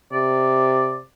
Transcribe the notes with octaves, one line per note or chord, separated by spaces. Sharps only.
C3 D5